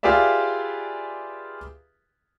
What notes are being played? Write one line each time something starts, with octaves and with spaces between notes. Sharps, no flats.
F4 G4 G#4 B4 D5 E5